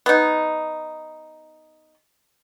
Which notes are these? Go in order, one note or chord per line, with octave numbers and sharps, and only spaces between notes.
B3 D#4